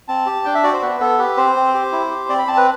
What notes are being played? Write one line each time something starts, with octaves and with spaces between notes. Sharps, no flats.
C4 A5
G4
D4 G5
E5
F#4 D5
C5
B3 B4
B3 A4
G4 B4
C4 C5
C4
G4
E4
G4
C4 D5
B5
C4 A5
B4